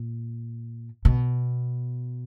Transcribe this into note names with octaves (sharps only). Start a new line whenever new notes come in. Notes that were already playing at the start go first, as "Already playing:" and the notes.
Already playing: A#2
B2